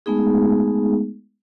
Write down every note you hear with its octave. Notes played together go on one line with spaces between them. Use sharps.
G#3 A3 B3 D#4 G#4